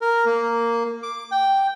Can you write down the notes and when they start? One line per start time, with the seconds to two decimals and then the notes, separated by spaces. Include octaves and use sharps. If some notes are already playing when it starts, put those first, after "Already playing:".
0.02 A#4
0.26 A#3
1.03 D6
1.32 G5